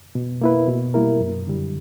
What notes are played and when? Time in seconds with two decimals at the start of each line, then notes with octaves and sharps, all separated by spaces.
0.15 B2
0.41 A#3 E4 B4
0.68 B2
0.94 G3 A#3 E4 A#4
1.21 F#2
1.47 D3 G3